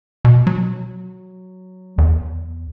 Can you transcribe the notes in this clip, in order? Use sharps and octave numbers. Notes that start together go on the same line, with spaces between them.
B2
F#3
E2